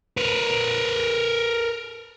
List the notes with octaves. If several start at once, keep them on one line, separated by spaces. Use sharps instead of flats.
A#4 B4